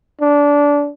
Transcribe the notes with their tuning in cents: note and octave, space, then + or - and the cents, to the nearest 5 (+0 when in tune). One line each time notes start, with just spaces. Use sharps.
D4 -20